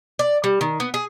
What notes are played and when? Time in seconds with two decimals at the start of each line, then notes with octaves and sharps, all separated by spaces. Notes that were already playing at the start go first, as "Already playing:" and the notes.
0.19 D5
0.44 G3
0.61 D#3
0.80 B3
0.94 G#4